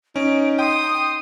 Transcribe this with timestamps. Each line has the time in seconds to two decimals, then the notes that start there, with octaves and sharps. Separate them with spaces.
0.16 C#4 D#4 D7
0.59 G5 C6 D#6